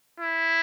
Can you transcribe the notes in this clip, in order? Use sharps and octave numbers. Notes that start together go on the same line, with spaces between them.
E4